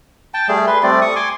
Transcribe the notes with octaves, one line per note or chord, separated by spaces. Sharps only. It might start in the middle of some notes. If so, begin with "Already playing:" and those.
G5 A5
G3 A3 G#4
B4 C6
G3 A3 C4 D5
C#6 D#6
G#5 C6 D6